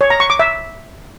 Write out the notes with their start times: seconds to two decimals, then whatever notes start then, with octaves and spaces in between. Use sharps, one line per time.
0.01 C#5
0.10 A#5
0.20 C#6
0.30 D6
0.39 E5